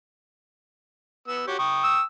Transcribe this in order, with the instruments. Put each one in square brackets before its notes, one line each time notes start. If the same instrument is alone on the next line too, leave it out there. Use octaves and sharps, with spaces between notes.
[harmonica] B3 E6
F#4 G4 C#5
G5 C#6 D#6
[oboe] E6